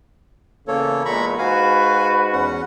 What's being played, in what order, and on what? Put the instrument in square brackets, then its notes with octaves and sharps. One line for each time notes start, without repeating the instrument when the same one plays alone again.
[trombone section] E2 C#3 [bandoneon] A#3 A4 C#5
[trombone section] E2 A#2 G#3 [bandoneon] A#5 B5 C#6
[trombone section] G#2 F#4 B4 [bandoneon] F5 G#5
[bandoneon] E2 C#4 F#5